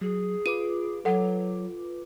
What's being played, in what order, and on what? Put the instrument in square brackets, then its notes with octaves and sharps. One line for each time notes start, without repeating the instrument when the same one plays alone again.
[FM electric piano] F#3 [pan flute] G#4
[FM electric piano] F4 B4 D6 [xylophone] D#7
[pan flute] F#3 [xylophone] A4 F#5